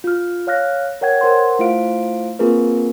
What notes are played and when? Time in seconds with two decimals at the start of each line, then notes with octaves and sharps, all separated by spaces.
0.04 F4 F6
0.47 C#5 F5 F6 F#6 A#6
1.01 A#4 C#5 F#5 G5 G#6
1.21 A#4 C5 F#5 C6
1.59 A3 E4 F4 C5 F5 D7
2.39 A#3 C4 F4 G#4 A#4 B4